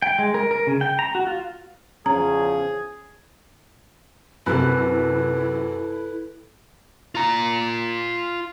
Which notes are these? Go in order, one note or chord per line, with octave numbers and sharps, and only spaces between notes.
G5
G#3
A#4
A#4
C#3
G5
A#5
F#4
F4
E2 C#3 F3 C#4 G#4 A#5
F#2 C3 E4 A4 B4
F4 A#5